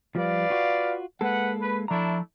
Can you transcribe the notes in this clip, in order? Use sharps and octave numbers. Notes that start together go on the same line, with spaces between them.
F3 G3 B4 D5 F5
F4 F#4
G#3 A#3 A4 B4 F#5
B4
F3 A3 D4 E4 A#5